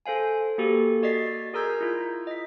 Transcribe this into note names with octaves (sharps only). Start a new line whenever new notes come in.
A4 C5 F5 G#5
A#3 F#4 G4 A4
F#4 D5 D#5 A6 B6 C7
G#4 A#4 A#5 E6 G6 G#6
E4 F4
D#5 B6